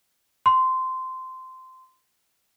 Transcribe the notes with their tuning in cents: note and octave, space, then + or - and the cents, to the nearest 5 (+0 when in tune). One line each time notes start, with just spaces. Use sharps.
C6 -15